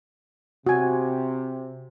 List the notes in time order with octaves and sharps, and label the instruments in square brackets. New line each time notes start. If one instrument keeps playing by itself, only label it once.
[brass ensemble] C3 [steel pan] F#4 G#5